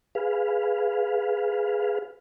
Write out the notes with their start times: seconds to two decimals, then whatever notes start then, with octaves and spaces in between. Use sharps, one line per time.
0.15 G#4 B4 F5